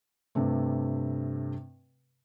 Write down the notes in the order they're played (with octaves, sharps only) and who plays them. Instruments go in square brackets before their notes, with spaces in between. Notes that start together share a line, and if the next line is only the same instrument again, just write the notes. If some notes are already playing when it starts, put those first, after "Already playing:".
[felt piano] G2 C3 A3